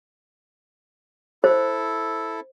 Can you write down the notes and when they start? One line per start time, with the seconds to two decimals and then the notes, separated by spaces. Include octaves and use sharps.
1.44 E4 A4 C5